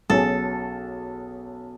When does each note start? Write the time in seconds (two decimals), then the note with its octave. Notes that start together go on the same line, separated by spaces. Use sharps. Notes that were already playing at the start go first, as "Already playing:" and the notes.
0.10 B1 B2 F#3 C#4 G#4 A4